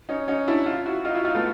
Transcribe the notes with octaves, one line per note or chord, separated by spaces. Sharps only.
C#4 D#4
C#4 D#4
D4 E4
D#4 F4
E4 F#4
D#4 F4
E4 F#4
D#4 F4
A3 B3